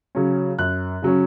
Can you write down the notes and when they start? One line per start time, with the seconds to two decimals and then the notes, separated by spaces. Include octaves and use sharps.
0.15 C#3 F#3 C#4
0.58 F#2 F#6
1.02 C#3 F#3 C#4